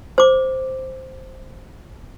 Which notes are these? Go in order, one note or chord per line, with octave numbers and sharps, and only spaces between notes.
C5 D6